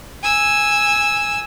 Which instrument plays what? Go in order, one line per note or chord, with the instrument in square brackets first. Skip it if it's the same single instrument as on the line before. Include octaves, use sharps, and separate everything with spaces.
[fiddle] G#5 E6